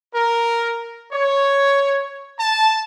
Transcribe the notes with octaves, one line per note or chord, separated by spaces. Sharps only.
A#4
C#5
A5